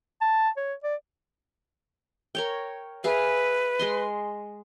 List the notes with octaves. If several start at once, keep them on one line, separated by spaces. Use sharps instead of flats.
A5
C#5
D5
A#4 C#5 G5
G#4 B4 E5 F5
G#3 D#5 C6